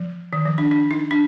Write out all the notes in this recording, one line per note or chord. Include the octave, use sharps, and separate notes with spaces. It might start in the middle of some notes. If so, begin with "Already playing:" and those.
Already playing: F3
D#3
F3
D4
D4
D#4
D4